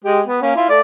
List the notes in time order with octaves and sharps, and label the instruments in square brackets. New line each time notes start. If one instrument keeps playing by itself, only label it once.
[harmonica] G#3 G4
B3
A#3 C#4
E4 F4
A3 D5